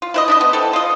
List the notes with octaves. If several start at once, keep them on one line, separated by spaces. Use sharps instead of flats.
F4
E4 B4 D#5
D4 E4 D#5
B3
E3 C4 A4
F4 D#5